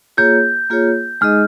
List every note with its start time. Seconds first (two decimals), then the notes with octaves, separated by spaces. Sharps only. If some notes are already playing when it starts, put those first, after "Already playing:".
0.17 A#3 F4 G#4 C#5 G6
0.70 A#3 F4 G#4 C#5
1.21 G#3 D#4 G#4 D#5 F6